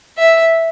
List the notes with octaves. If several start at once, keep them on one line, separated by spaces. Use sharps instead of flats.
E5